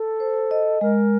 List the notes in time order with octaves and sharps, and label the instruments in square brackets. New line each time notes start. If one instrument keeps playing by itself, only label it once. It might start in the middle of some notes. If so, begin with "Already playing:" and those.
Already playing: [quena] A4
[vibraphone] C5
D#5
[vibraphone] G#3 [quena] A#4